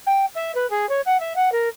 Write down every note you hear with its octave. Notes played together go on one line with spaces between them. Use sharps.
G5
E5
B4
G#4
C#5
F#5
E5
F#5
A#4